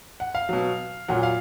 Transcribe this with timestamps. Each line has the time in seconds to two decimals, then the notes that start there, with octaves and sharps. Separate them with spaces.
0.20 F#5
0.35 F5
0.49 B2 F#3
1.08 A#2 F#3 F#5
1.23 F5